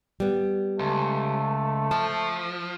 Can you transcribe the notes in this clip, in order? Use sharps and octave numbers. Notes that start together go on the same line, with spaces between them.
G3 B3
C#2 A3
F3 A5